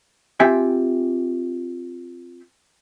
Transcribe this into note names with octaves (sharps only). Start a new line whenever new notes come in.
C4 F4 G4 E5 G5 G#5